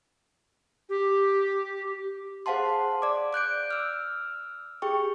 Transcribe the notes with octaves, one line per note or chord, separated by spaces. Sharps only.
G4
G#4 C5 F5 F#5 A5 C6
D5 D6
D6 F#6 G6 D7
E6 F6
G4 G#4 G5 C#6